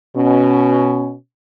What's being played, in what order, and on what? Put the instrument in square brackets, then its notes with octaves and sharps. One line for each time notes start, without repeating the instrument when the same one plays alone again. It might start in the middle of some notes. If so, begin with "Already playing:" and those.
[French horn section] B2 C#4